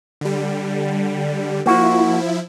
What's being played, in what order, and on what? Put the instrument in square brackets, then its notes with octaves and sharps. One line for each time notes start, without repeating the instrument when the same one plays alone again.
[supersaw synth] D3 G3
[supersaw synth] F3 E4 [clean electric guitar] A#3 F#4